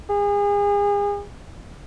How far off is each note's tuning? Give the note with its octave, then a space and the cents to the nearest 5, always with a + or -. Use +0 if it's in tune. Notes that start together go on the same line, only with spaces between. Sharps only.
G#4 -35